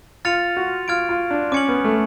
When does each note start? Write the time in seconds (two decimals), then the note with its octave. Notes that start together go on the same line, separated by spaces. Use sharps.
0.25 F4 F6 A6 C#7 F7
0.57 F#4
0.88 F4 F6 G#6 D7
1.09 F4
1.31 D4
1.52 C#4 D6 G#6 C#7 F#7
1.68 B3
1.84 A3